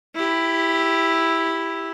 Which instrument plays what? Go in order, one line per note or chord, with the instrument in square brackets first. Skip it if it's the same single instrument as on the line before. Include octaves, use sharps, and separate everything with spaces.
[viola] E4 G4